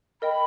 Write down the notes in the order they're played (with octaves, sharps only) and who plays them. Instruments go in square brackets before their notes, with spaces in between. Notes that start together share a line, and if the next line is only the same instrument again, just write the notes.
[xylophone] A#4 D#5 G5 [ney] B5